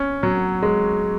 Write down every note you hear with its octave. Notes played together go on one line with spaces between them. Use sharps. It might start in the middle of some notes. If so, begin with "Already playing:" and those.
Already playing: C#4
F#3
G#3